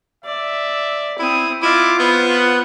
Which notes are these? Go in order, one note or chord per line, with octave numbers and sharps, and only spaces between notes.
D5 E5
C4 E4 D#6
E4 F4 D#5 D6
B3 C5 F#5 B5